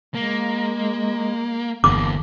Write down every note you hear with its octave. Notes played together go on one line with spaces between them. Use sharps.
G#3 A#3
G1 E2 D3 A#3 D6